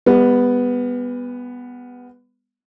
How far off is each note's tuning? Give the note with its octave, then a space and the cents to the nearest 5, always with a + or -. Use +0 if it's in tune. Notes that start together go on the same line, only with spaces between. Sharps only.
G3 +45 B3 +0